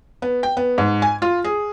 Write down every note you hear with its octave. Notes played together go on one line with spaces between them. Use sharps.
B3
G5
B3
G#2
G#5
F4
G#4